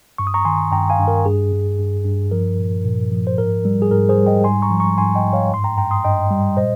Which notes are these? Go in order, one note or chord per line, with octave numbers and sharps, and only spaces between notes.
G2 C#6
D#6
A#5 C#6
D#3 G#5 C6
G2 G5 A#5
F5 G#5
G2
A#4
G2 G#4
G2
G2
G2
F3 A#4
A#2
A#2
F3
C5
G#2 A#4
G3
G#4
G#2 A#4
G#4 C5
G3
D#5 G5
G#2 G#5 C6
A#5 C#6
F3
A#5 C#6
G#2 G#5 C6
D#5 G5
G#2
C#5 F5
G2 C6
G5 A#5
G2 G5 A#5
C6 D#6
G2 D#5 G5
G3
A#2 C5 D#5